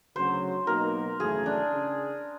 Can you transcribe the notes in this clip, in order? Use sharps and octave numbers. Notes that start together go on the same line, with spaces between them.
D2 C#3 F#3 C5
B2 F#3 A#3 D#4 A#4
G#1 F#2 C#3 E3 A3 G#4
D4
C#3